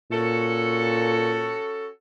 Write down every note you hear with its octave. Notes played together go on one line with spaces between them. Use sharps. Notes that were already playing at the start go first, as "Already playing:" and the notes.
A#2 C#4 F#4 A4